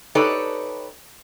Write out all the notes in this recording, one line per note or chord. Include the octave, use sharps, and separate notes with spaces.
D#4 G4 A4 B4 C#5 D5